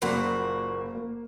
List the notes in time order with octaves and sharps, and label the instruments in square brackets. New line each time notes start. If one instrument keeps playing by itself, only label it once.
[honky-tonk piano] F#1 A#3 B5 [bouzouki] A#2 F#4
[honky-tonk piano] A#3